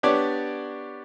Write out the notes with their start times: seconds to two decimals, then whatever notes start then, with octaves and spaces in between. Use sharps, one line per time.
0.03 B3 D4 G4 C#5 D5